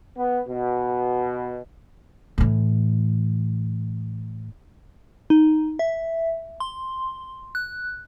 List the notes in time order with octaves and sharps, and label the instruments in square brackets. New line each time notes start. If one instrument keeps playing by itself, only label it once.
[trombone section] B3
B2
[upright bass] A2 E3
[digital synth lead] D#4
E5
C6
F#6